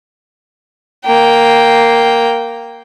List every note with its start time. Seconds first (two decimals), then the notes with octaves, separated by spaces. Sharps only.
1.05 A#3 G5